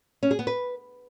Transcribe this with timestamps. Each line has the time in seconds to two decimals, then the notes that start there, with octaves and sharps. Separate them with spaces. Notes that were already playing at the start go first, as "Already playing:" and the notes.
0.23 C#4
0.31 G#4
0.39 B3
0.47 B4